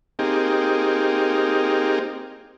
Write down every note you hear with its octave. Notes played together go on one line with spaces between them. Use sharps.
A#3 C4 D#4 G4 G#4